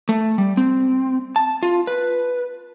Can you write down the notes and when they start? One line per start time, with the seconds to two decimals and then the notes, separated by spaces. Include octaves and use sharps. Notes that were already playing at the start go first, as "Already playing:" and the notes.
0.09 A3
0.38 G3
0.57 C4
1.36 A5
1.63 F4
1.87 B4